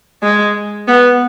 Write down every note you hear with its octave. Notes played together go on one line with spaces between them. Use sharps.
G#3
B3